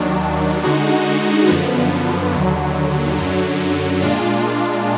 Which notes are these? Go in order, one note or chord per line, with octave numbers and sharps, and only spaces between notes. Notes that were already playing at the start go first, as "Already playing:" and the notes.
Already playing: D#2 D#3 F#3 D4
D3 G#3 D#4 F#4
F#2 D3 F3 B3
D#2 D3 F#3
F#2 D3 F#3
A#2 G#3 D4 F4